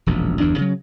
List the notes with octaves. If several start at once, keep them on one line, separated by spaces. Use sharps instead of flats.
E1 A#1 F#2
G1 E2 G2 D4
C#3 F#3